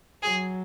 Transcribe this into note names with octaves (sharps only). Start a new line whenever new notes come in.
F#3 G#4